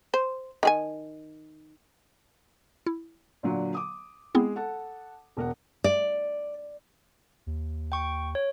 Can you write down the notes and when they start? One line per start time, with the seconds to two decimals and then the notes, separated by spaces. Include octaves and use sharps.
0.14 C5
0.63 D#3 G#4 G#5
2.86 E4
3.43 A#2 D3 F#3
3.74 D6 D#6
4.35 G#3 B3 C4 E4 G#4
4.55 A4 F#5 A5
5.37 E1 A#4 F#5
5.84 D5
7.47 D#2
7.92 G5 C#6
8.35 C#5